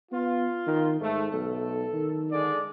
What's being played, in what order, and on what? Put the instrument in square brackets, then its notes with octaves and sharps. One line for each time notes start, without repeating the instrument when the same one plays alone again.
[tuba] B3 [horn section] F4
[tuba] D#3
[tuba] G#2 [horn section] A3
[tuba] B1 [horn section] A4
[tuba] D#3
[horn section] D3 G#3 D5